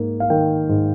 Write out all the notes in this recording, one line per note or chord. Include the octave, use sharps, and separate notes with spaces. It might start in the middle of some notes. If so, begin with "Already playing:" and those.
Already playing: G#2 A#3
F5
D#3 G5
G#2